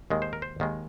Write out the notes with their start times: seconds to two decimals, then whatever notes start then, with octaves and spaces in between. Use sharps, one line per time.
0.10 D#2 D#3 G#3
0.22 C5
0.33 A#4
0.42 C5
0.60 D#2 D#3 G#3